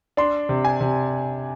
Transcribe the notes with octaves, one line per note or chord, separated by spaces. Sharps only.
D4 C6
C3
G#5
C3